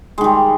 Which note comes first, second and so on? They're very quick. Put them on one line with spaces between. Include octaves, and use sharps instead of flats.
G#3 D#3 G3